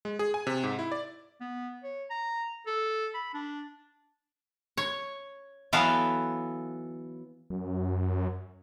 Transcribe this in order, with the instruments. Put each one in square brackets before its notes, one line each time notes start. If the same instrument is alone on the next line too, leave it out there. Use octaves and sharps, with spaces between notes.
[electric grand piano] G#3
G#4
G#5
C3
G#2
E4
D5
[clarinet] B3
C#5
A#5
A4
B5
D4
[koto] C#5
E3 F#3 B3 A4 F5
[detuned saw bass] F#2